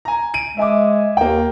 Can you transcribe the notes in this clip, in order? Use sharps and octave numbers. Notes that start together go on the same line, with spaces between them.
G#5 A#5
D7 D#7
G#3 E5 G#5 D6
D#2 A#3 G5